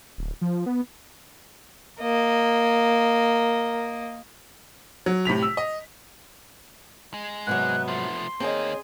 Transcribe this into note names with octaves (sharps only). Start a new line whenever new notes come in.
D1
F3
B3
A#3 D#5
F#3
A2 C3 B6 F7
E6
D#5
G#3
G#2 C3 F#3 B3 F#6
F3 A3 C6
D#3 A#3 C4 G#4 C#5 D#5